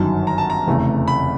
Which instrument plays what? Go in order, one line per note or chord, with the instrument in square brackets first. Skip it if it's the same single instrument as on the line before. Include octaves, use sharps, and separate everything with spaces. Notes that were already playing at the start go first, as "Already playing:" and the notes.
Already playing: [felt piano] G1 F#2 D#3 F#3 [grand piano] A5
[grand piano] A#5
A5
A#5
[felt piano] F1 E2 C#3 E3 A3
[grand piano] B5